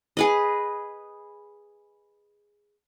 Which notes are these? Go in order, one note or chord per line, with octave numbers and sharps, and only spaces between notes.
G#4 B4 D#5